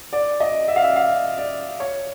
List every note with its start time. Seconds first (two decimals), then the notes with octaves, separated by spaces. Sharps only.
0.13 D5
0.40 D#5
0.68 E5
0.76 F5
0.84 E5
0.96 F5
1.38 D5
1.80 C#5